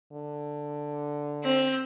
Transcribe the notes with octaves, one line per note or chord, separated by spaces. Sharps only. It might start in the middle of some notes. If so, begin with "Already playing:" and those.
D3
C4